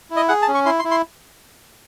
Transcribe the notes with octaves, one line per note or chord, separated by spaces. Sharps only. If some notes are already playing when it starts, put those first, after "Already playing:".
E4
D#5
G#4 F#5
A5
C#4
C#6
E4 C6
C6
E4
C6